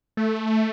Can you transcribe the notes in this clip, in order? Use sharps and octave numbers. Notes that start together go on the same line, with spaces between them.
A3